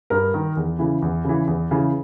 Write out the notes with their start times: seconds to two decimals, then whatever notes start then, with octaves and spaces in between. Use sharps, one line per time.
0.10 G2 A#4
0.34 D#3
0.57 E2
0.79 C#3 E3
1.02 E2
1.25 C#3 E3
1.47 E2
1.71 C#3 E3